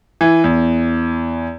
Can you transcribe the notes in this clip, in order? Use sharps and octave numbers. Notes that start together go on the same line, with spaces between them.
E3
E2